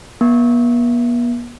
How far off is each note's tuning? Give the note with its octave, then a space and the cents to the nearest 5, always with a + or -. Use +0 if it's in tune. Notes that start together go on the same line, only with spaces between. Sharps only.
B3 -45